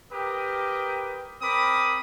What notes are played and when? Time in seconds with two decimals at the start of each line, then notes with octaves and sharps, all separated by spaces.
0.13 G4 A#4 B4 G5 D#6
1.42 C4 A#4 B5 D6 D#6